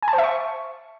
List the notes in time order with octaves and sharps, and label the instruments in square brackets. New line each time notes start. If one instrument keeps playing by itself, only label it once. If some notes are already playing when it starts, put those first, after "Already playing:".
[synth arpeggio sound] G#5
A5
C5
E5
C#6